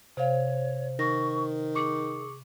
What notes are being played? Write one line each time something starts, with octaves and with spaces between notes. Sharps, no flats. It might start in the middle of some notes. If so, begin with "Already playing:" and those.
C3 C5 C#5 F5
D#3 C#6 A#6
G#4 C#6 D6 C#7